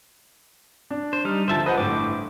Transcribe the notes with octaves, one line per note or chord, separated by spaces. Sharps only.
D4
C5
G3 D#4 F6
D2 F3 C5 E5 A5
B4 C5 D#5 F#5
G1 A2 D6